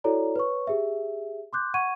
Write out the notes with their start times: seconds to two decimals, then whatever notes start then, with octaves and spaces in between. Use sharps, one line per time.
0.04 E4 F#4 A4 C#5 D5 A#5
0.36 B4 C#5 C#6
0.67 G4 G#4 E5
1.53 C6 D6 F#6 G6
1.74 F#5 C#6 G#6 D#7